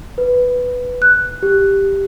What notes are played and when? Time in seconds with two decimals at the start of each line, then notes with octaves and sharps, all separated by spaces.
0.18 B4
1.02 F#6
1.43 G4